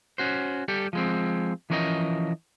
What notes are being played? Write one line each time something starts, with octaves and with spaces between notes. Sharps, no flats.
C#4 F#4 C5
G3 G4 A4
F3 G#3 C4
E3 F3 C#4 A#4 C#5 D#5